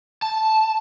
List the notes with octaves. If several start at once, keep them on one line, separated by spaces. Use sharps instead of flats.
A5